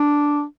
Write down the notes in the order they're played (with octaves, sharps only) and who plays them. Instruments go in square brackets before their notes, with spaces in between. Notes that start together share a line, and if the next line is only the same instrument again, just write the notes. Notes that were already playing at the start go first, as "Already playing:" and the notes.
Already playing: [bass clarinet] D4